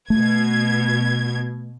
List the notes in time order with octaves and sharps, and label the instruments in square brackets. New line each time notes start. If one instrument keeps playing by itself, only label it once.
[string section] B2 G#6 [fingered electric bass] A3